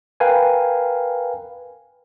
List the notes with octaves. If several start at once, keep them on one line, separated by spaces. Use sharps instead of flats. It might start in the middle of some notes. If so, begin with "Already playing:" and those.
A#4 B4 F5 G5 G#5